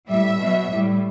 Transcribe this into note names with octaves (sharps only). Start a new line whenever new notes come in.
A2 G3 E5
B2 F#3
A2 G3